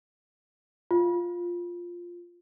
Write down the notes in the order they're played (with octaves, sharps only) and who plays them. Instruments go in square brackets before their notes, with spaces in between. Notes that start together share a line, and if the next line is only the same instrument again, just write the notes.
[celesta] F4